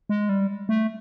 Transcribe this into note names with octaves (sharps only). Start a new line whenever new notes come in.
G#3
G3
A3